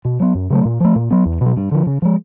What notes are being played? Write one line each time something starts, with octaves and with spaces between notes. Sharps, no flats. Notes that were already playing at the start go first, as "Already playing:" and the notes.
B2
F#3 B3
F#2
C#3 F#3 A3
A#2
F3 A3
A#2
F#3 B3
E2
B2 F#3
G2
D3 F3
C#3
F3 G#3